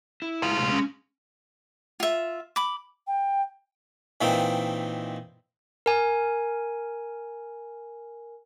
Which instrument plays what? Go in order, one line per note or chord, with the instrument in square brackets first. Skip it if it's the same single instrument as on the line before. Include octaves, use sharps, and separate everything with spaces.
[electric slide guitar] E4
[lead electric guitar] G#3 F5
[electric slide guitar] A2 C3
C#4
[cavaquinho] F4 E5
B5 D6
[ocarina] G5
[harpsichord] A#2 D#3 E3 C4 D#4
[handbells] A#4 G#5